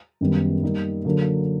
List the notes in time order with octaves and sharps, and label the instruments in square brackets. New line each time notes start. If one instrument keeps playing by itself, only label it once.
[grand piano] F#2 D#3 G3 B3
G3 A#3 D#4
D3 F#3 A#3